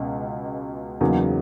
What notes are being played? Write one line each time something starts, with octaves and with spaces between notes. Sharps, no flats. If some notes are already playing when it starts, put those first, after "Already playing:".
Already playing: C#2 B2
E2 C#3 F#3 A#3 D#4